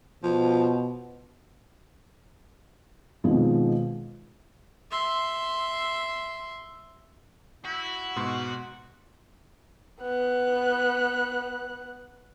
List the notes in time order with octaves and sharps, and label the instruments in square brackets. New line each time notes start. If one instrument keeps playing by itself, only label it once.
[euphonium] B2 [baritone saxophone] F3
[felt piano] B2 D#3 F3 G#3 C4
[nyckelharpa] E5 C6
[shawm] E4 [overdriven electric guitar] F#4
[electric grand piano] G#2 B2 C6
[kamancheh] B3 F#6